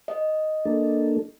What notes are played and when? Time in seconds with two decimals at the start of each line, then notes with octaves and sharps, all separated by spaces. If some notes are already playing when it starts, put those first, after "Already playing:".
0.08 D#5
0.65 A#3 D4 A4